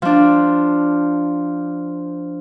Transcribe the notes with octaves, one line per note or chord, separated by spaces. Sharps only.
F3 D4